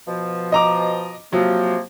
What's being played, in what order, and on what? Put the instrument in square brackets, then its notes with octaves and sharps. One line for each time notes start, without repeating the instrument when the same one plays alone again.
[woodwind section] B2 F3
[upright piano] D#5 A#5 D6
[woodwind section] C3 F3 A#3 [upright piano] F#3